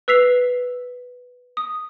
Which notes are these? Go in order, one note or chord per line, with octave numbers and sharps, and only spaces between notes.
B4 E6 B6 C7 F7
D#6